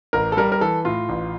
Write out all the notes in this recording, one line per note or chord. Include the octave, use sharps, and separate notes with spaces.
A1 A#4
A4
G3 A#4
A#4
E3 A4
A2 F4
A1